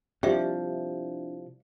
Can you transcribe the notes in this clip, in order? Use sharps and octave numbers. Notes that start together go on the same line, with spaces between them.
C3 F3 G3 D4 E4 G4 E5